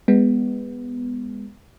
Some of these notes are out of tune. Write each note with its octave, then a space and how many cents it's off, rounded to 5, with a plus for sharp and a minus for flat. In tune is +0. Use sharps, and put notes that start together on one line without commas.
G#3 -25 B3 +0